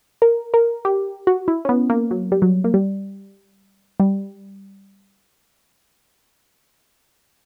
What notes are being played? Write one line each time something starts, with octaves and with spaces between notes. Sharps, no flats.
A#4
A#4
G4
F#4
E4
C#4
B3
A#3
F#3
G3
F#3
A#3
G3
G3